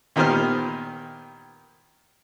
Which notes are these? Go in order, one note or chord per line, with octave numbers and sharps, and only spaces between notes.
A#2 D#3 B3 G4 C5 F6